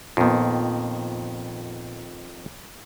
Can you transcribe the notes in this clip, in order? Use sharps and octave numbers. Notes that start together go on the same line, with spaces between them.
F2 A#2 D#3 B3